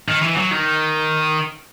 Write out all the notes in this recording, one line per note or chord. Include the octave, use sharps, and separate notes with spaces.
D#3
E3
F#3
D#3